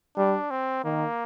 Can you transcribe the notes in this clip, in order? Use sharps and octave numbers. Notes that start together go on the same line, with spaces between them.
G3 D4
C4
D#3 A#3